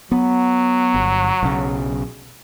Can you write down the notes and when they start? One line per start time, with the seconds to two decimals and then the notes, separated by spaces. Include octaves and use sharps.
0.12 F#3 B3
0.94 G1
1.43 B1 C#3